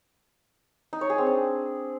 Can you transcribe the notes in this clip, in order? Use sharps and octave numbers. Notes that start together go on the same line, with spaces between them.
D#4
C#5
G#4
C4
D4